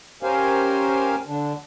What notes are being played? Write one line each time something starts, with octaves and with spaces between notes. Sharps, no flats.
C#4 G4 A#4 C5 F5 G#5
D3 D4